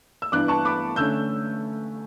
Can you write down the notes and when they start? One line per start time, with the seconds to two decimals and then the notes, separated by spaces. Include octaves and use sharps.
0.22 E6
0.32 G2 E3 B3 D4 D6 F#6
0.48 A5 C#6
0.65 B5 D6
0.96 D3 A3 C#4 E6 G6